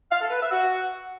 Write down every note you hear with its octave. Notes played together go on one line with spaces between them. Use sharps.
F5
A4
B4
E5
F#4